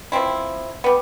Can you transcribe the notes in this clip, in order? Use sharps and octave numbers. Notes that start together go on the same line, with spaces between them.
F3 C4 E4
G3 B3